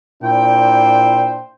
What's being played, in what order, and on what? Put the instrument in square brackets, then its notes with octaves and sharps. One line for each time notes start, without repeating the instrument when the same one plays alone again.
[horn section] A#2 D4 E4 C5 G5